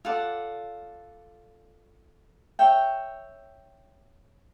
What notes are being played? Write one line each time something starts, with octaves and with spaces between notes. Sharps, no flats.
F4 A4 D5 F#5
C#5 E5 G5